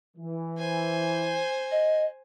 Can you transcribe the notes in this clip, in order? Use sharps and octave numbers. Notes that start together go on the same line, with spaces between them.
E3
C5 G#5
D#5